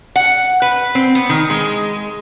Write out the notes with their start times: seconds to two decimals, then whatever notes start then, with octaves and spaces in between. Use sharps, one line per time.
0.16 F#5
0.62 B4
0.95 C4
1.15 B3
1.29 D#3
1.50 G#3